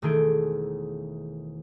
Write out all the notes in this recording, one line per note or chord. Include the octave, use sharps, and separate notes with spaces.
E1 D#3 A3 G#4 G6 D7